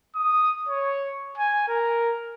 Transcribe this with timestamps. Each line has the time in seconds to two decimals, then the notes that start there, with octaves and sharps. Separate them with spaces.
0.16 D#6
0.69 C#5
1.38 G#5
1.68 A#4